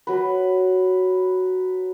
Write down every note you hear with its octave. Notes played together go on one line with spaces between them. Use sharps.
F#3 B4